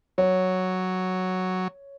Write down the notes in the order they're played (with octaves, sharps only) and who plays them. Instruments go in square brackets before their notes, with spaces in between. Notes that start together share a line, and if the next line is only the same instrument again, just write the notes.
[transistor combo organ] F#3 [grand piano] C#5